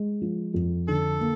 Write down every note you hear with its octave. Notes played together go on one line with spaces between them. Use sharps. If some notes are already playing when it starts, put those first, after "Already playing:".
Already playing: G#3
F3
F2
D3 A4
A#3